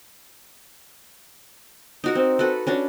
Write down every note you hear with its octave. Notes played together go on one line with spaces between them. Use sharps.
D#4 F#4 A#4
C4
F#4 A4 B4
C#4 D4 F#4